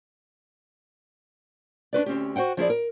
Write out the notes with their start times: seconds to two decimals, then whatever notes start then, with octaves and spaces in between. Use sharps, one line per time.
1.93 D4 F#4 B4 D5
2.06 D2 C4 C#4 G4
2.36 F#4 C5 F#5 G5
2.57 F3 E4 G#4 D5
2.70 A#4